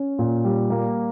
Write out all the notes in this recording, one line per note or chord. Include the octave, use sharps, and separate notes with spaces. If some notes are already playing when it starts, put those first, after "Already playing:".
Already playing: C#4
A#2
G3
A#3